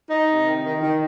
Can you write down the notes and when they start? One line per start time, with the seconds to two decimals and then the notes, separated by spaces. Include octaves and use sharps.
0.07 D#4
0.26 C3
0.45 D#3
0.62 D#3
0.80 D#3